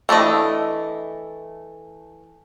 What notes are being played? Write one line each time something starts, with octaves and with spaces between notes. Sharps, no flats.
E3 A3 D4 D#5